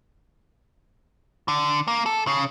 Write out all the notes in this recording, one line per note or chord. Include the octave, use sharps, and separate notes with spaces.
D3
A#3
A4
C#3